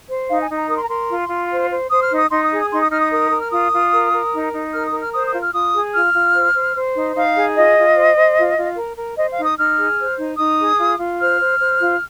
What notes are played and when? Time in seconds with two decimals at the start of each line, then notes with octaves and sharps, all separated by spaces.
0.08 C5
0.29 D#4 F5
0.42 G#5
0.50 D#4
0.56 A#5
0.69 A#4 D#6
0.76 C6
0.83 A#5
0.89 A#4 C6
1.10 F4
1.29 F4
1.51 C5
1.70 C5
1.90 C5 D#6
2.04 F6
2.10 D#4
2.17 D#6
2.30 D#4 C6
2.44 D#6
2.51 G#4
2.58 D#6
2.71 D#4 C6
2.81 D#6
2.91 D#4 F6
3.01 D#6
3.12 A#4 D#6
3.31 A#4
3.41 F6
3.51 F4 D#6
3.72 F4
3.93 A#4
4.13 A#4
4.32 D#4
4.52 D#4
4.73 A#4 F6
4.86 D#6
4.93 A#4
5.01 F6
5.13 C5 D#6
5.27 D#6
5.33 F4
5.40 F6
5.53 F4 D#6
5.74 G#4
5.94 F4 F6
6.14 F4
6.34 C5
6.54 C5
6.76 C5
6.95 D#4
7.16 D#4 F5
7.36 G#4
7.55 F4 D#5
7.76 F4
7.96 C5
8.16 C5
8.37 F4
8.56 F4
8.76 A#4
8.97 A#4
9.17 C5 D#5
9.31 F5
9.38 D#4
9.44 D#6
9.57 D#4 F6
9.78 G#4
9.98 C5
10.18 D#4
10.38 D#4 D#6
10.59 G#4
10.78 F4
10.99 F4
11.19 C5 F6
11.39 C5
11.59 C5
11.80 F4